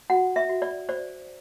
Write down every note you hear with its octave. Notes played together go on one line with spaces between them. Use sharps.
F#4 F#5
E5
F#4
D5
C5 D5